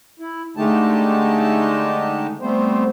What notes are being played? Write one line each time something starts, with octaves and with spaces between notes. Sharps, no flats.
E4
D3 G#3 A3 D#4 G4 A5
G3 A3 B3 C4 C5